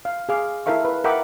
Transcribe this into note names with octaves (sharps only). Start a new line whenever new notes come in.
F5
G#4 F5 D6
E4 A4 A#4 E5 F5 C#6
B4
A#4 E5 F#5 G5 B5 D6